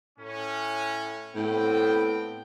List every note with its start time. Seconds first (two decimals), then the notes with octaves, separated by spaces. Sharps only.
0.19 A2 C#4
1.35 A2 B3 C4 G5